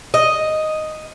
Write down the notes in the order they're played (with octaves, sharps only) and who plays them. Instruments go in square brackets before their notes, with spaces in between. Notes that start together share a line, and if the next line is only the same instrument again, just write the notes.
[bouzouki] D#5